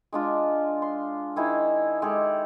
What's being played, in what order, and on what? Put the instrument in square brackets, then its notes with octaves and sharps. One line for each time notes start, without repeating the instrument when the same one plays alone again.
[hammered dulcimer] G#3 D4 F4
C6
D#3 E4 G#4
G#3 G4 A4